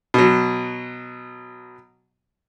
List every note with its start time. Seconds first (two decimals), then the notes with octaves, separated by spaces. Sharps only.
0.14 B2 F#3